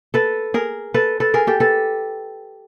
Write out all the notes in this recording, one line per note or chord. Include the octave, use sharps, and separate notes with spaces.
A4 B4
G#4 A#4
A4 B4
A4 B4
G#4 A#4
G4 A4
A4 B4